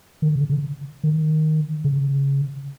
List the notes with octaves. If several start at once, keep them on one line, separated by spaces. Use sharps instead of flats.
D#3
C#3
C#3
D#3
C#3